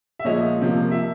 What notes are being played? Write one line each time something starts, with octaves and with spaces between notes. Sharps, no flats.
E5
A#2 F3 G#3 C#5 D#5
C3 F3 A#3
E5